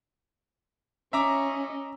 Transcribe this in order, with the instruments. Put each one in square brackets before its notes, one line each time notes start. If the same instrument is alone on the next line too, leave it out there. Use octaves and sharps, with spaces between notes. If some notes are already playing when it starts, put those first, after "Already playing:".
[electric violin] C#4 D#5 [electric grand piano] E5 A#5 D6